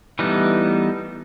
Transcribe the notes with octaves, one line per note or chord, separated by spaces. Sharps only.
E3 G3 A3 B3 D#4